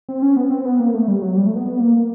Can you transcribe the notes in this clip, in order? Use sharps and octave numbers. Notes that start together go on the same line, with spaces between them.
C4
C#4
B3
C4
B3
A#3
A3
G3
F#3
G3
A3
B3
B3
A#3